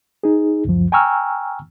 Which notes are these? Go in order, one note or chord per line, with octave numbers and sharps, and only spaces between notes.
D#4 G#4
C#2 F#2 F3
G5 G#5 A#5 C#6 E6 F6